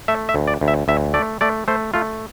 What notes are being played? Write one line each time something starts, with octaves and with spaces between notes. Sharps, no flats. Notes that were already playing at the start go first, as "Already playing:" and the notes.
A3 E5
E5
D2
D5
D2
E5
D2 E5
A3 D5
A3 D5
A3 C5
A3 F4